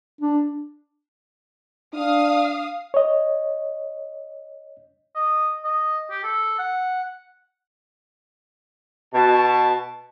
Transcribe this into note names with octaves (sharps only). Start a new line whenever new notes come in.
D4
D4 F5 D#6
C#5 D#5
D#5
D#5
G4
A4
F#5
B2 A5